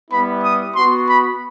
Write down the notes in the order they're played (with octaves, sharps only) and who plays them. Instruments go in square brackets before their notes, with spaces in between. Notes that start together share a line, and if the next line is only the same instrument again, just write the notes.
[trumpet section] G3 B3 E4 B5
D#6
B3 F#4 C6
B5